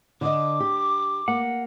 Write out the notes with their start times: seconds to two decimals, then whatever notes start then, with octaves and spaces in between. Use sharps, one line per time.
0.21 D3 D#5 D6
0.60 G4
1.28 A#3 F#5